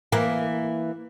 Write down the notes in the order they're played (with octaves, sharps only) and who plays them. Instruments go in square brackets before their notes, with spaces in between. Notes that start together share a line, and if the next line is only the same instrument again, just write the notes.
[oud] E3 A#3